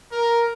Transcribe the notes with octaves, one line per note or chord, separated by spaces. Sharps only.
A#4